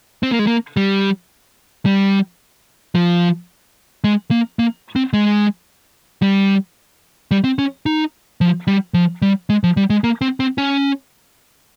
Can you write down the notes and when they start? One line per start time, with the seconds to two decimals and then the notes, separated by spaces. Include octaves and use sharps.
0.23 C4
0.32 A#3
0.39 G#3
0.47 A#3
0.77 G3
1.86 G3
2.95 F3
4.04 G#3
4.31 A#3
4.59 A#3
4.96 C4
5.13 G#3
6.22 G3
7.31 G3
7.44 C4
7.59 C#4
7.86 D#4
8.41 F3
8.67 G3
8.94 F3
9.22 G3
9.50 G#3
9.64 F3
9.77 G3
9.90 G#3
10.04 A#3
10.21 C4
10.40 C4
10.58 C#4